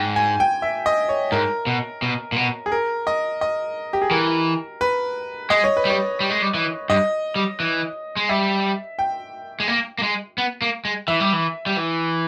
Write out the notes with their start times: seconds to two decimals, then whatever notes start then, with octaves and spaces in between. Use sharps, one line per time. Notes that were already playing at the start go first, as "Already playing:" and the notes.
Already playing: G#2 G5
0.16 G#5
0.40 G5
0.62 E5
0.86 D#5
1.09 C#5
1.32 G#2 A#4
1.67 B2
2.02 B2
2.32 A#2
2.36 B2
2.66 G#4
2.72 A#4
3.07 D#5
3.41 D#5
3.93 G4
4.02 G#4
4.11 E3 A#4
4.81 B4
5.50 G#3 D#5
5.64 C#5
5.77 B4
5.85 G3 C#5
6.20 G3
6.30 G#3
6.42 G3
6.54 E3
6.90 G2 D#5
7.36 G3
7.60 E3
8.17 G#3
8.29 G3 E5
8.99 G5
9.60 G#3
9.68 A#3
9.98 A#3
10.03 G#3
10.38 B3
10.62 A#3
10.85 G#3
11.08 E3 E5
11.20 G3
11.33 E3
11.66 G3
11.77 E3